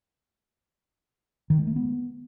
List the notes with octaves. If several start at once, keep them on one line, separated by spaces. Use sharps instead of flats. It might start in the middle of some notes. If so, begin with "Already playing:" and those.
D#3
G#3
A3
B3